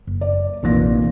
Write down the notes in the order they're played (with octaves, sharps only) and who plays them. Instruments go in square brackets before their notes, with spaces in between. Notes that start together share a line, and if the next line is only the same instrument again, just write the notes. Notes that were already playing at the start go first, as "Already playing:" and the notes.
[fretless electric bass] F#1
[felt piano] D5
[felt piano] F1 A#2 A#6 [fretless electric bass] A#1 D#3 E3